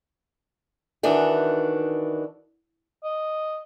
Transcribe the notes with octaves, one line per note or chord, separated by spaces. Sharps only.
D#3 E3 D4 F#4
D#5